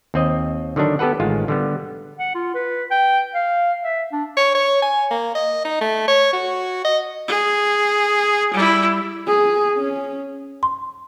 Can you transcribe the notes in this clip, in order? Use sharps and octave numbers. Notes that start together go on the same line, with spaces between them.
D#2 C4 D#5
D3 D#3 F#3 D4
B3 G4 A4 B4 F#5
A1 D#3 G#3 F4
D3 G3 B3
F#5
F4
B4
G5
F5
E5
D4
C#5
C#5
G#5
A#3
D#5
D#4
A3
C#5
F#4
D#5
G#4
G3 E4
G#4
C#4
C6